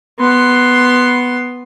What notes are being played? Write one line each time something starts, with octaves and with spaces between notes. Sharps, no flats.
B3 C6